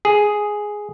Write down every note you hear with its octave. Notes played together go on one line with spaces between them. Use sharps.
G#4